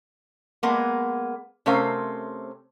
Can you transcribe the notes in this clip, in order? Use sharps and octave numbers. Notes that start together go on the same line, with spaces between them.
G#3 A#3 B3
C3 A3 C#4 A#4 C5 F5